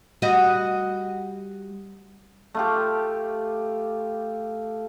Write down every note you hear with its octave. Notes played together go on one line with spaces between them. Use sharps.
G3 F#4 D#5
A3 F4 G4